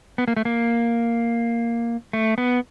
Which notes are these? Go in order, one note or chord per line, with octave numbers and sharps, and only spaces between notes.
B3
A#3
A3
A#3
A3
B3